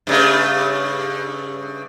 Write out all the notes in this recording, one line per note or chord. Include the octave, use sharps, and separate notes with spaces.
G2 C#3 A3